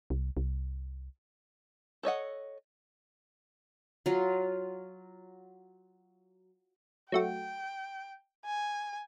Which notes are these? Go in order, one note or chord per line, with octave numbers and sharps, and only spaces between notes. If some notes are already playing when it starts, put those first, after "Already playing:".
C2
C2
A4 C#5 D#5 F#5
F#3 F4
F#3 A3 F#4 G5
G#5